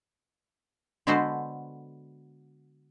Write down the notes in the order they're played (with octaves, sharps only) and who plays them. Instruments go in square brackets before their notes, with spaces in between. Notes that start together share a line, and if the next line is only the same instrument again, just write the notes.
[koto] D3 G#3 B3 F#4 A4 C5